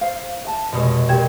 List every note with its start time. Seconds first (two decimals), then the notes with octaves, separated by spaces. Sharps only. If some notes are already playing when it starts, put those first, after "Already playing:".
0.01 C5 F5
0.45 E5 A5
0.72 F1 B2 G#3
1.09 A#1 F4 G4 G5 G#6 E7